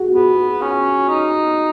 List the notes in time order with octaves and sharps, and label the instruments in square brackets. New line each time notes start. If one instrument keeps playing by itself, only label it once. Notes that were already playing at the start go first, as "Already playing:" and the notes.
Already playing: [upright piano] F#4 G#4
[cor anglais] B3 [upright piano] G#4
[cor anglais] C#4
D#4